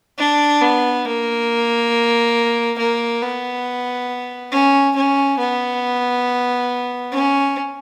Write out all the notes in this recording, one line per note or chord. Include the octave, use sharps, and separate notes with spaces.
D4
B3
A#3
A#3
B3
C#4
C#4
B3
C#4